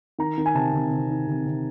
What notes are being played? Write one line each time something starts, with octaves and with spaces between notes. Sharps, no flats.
D#3 A#5
D#3
G#5
C3 A5
C3
C3
D#3
C3
C3